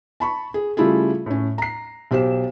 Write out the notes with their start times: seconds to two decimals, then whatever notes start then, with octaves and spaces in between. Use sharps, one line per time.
0.20 A5 B5 C#6
0.54 G#4
0.77 C#3 G3 A3 E4 F4 G#4
1.26 A2 C#4
1.58 A#5 C7
2.11 B1 G4 C5 E7